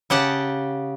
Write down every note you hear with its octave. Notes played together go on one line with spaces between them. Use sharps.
C#3 G4 F#5 A5